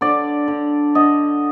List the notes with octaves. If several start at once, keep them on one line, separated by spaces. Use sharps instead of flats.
D3 D5
D3
D3 D#5